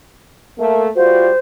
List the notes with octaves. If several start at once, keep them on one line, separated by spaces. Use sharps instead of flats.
A3 A#3
G3 F4 F#4 C5